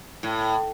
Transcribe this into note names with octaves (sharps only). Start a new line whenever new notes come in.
A2